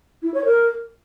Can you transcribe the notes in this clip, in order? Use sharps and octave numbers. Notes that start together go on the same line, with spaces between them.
E4
C#5
A#4